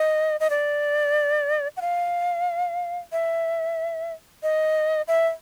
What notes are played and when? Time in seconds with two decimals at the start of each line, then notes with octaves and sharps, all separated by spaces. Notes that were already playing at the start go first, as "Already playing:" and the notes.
Already playing: D#5
0.40 D#5
0.50 D5
1.77 F#5
1.81 F5
3.12 E5
4.43 D#5
5.08 E5